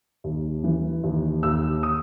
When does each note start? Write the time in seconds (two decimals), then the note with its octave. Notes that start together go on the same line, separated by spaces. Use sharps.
0.24 D#2
0.64 E3
1.03 D#2
1.43 D#2 E6
1.83 D#6